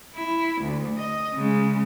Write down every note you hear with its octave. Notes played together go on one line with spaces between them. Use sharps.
E4
D2
D#5
C#3 G#3